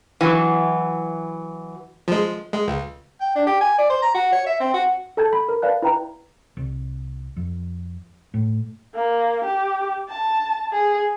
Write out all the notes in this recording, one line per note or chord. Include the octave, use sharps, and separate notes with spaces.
E3 F#3
F3 G#3
G#3
C#2
G5
D4
G4
G#5
D5
C5
A#5
F#4
C#5
E5
C4
F#4
A4 A5 G6 G#6
B5
A#4
B4 D5 F5 A5 F#6
E4 B4 G5 A#5
C2
F2
A2
A#3
G4
A5
G#4